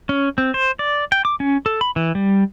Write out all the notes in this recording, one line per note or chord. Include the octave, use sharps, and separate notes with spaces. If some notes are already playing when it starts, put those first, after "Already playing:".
C#4
C4
C5
D5
G5
D6
C#4
A4
B5
E3
G3